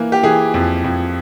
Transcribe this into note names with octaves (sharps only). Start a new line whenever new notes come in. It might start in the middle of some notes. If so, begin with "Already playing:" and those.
Already playing: E3 A#3
G4
E3 G#4
F2
F2